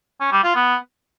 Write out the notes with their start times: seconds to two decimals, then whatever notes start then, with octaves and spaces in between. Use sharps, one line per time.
0.20 C#4
0.32 G3
0.44 F4
0.55 B3